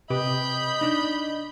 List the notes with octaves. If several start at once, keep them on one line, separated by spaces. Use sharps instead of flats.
C3 G4 B4 D#5 B5 G6
D4 D#4